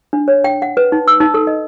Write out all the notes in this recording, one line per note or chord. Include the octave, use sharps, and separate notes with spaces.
D4
C#5
G5
F#5
B4
D#4
E6
D#4
A4
D#5